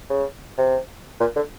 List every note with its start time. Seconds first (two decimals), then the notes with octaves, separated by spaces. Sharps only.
0.10 C#3
0.58 C3
1.20 A#2
1.36 D3